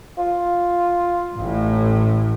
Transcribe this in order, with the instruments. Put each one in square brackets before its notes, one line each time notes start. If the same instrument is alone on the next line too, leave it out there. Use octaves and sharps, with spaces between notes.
[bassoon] F4
[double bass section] A1 A2